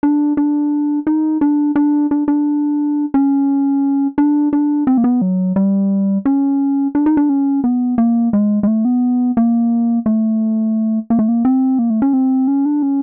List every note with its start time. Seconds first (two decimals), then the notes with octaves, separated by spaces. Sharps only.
0.03 D4
0.37 D4
1.07 D#4
1.41 D4
1.76 D4
2.11 D4
2.28 D4
3.14 C#4
4.18 D4
4.53 D4
4.87 C4
4.98 A#3
5.04 B3
5.22 F#3
5.56 G3
6.25 C#4
6.95 D4
7.06 D#4
7.17 D4
7.29 C#4
7.64 B3
7.98 A#3
8.33 G#3
8.63 G#3
8.67 A3
8.85 B3
9.37 A#3
10.06 A3
11.10 A#3
11.19 A3
11.28 A#3
11.45 C4
11.79 A#3
11.90 A3
12.02 C#4
12.13 C4
12.48 C#4
12.65 D4
12.83 C#4